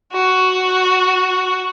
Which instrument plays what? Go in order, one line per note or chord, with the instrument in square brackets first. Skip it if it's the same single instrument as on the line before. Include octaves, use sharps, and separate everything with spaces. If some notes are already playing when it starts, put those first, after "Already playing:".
[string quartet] F#4